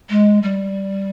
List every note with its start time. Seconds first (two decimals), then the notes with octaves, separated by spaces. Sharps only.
0.10 G#3
0.43 G3